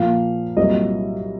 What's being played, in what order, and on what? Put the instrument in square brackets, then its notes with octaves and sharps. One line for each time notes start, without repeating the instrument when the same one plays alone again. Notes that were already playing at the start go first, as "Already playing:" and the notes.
Already playing: [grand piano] A#2 F3 A#3 F5
C2 A#2 F#3 A#3 D#5